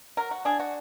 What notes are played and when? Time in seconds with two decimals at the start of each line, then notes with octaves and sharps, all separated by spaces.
0.17 F#3 A#4
0.31 F#4
0.45 D4 G#4
0.60 F#4